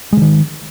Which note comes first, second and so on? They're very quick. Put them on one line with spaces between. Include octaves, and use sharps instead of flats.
G#3 D3 D#3